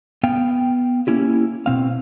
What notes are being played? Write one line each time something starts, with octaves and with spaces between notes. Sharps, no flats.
B3 F5 G5
A#3 C#4 E4 G4
B2 C4 F5